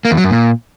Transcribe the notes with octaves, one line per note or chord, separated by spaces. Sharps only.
A#3
E2
F#3
F#2
A#2